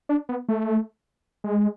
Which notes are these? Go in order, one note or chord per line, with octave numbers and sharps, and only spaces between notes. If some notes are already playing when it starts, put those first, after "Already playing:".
D4
B3
A3
G#3